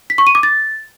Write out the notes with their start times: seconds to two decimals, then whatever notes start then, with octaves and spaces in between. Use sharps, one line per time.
0.10 B6
0.18 C#6
0.27 D#7
0.35 D6
0.43 A6